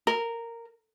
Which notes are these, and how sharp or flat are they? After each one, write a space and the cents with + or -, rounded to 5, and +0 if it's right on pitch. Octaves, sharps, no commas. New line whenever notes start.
A#4 -10